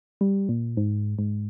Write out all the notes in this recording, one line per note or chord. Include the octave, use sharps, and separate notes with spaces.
G3
A#2
G#2
G#2